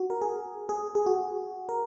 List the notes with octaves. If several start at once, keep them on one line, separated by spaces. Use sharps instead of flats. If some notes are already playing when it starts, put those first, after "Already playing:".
Already playing: F#4
A#4
G#4
G#4
G#4
F#4
A#4